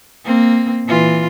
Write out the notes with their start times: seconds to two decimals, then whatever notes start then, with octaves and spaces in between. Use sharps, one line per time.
0.25 A#3 C4
0.86 A#2 E3 F4